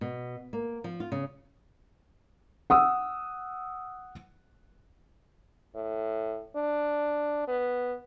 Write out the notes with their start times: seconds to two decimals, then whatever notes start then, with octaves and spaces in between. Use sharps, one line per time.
0.01 B2
0.53 A#3
0.84 F3
1.00 F4
1.12 C#3
2.70 F#5 D#6 E6
5.75 A2
6.56 D4
7.47 B3